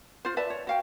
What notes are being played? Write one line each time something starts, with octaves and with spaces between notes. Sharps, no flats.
F4 C5
B4 D5 E5 A5
C#5
F#4 F5 G5